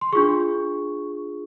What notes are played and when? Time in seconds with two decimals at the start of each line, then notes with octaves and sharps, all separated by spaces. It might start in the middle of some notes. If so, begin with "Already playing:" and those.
0.01 C6
0.13 D4 F4 G#4 C#6